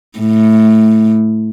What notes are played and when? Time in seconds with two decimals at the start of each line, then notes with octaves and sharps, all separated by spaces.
0.19 A2